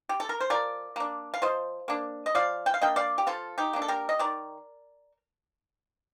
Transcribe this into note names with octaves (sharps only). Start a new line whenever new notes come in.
G4
A4
A#4
C5
F3 A#4 D5
A#3 D4
F5
F3 C5 D#5
A#3 D4
D#5
F3 D5 F5
G5
F5
A#3 D4 D#5 G5
D5 F5
G4
F3 F4 A4
D#4 G4
A#3 D4
A4
G4 A#4
D#5
D#3 A#4 D5